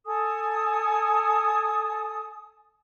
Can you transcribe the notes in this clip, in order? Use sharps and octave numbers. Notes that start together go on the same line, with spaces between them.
A4 G#5 D#6